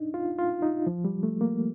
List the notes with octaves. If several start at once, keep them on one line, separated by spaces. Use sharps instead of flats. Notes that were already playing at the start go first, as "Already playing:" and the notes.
Already playing: D4 D#4
F4
F4
D#4
F3
G3
A3
A#3